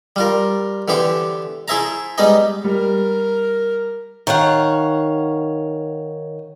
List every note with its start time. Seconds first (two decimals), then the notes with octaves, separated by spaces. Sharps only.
0.16 G3 F4 A#4
0.88 D3 E3 B3 G4 C5
1.68 E4 G#4 C5 E5 A5 A#5
2.18 G3 G#3 B3 D#4 D#5
2.64 G3 A#4
4.27 D#3 C#5 F5 F#5